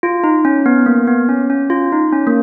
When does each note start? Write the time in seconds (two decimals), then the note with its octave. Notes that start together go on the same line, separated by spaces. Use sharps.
0.03 F4
0.24 D#4
0.45 C#4
0.66 B3
0.86 A#3
1.07 B3
1.29 C#4
1.50 C#4
1.70 F4
1.92 D#4
2.13 C#4
2.27 A#3